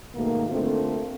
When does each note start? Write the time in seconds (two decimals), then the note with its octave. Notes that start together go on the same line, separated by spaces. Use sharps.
0.15 G#2 B2 D#3 A3 A#3
0.50 D3 A3 A#3 C4 F4 A4